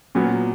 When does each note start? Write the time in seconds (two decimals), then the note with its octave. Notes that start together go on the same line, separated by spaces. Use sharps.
0.15 A#2 F#3 B3